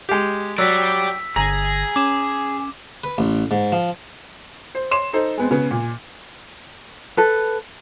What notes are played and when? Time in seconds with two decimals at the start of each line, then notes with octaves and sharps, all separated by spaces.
0.09 G#3 G4
0.58 F#3 G4 D5 E6 B6
1.36 G1 D3 G#4 A#5 A#6
1.96 C#4 D6 E7
3.04 B4
3.18 A1
3.51 G#2
3.72 F3
4.75 C5
4.91 C#5 C6 E7
5.13 D#4 A4 C5
5.37 G#3 B3 C4
5.51 C#3 B3
5.71 A#2
7.17 A4 B4